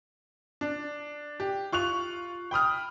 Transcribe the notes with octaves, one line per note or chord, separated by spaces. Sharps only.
D4
G4
F4 C#6 F#6 F7
G5 B5 D#6 F6